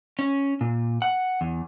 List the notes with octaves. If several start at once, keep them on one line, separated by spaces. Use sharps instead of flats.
C#4
A#2
F#5
E2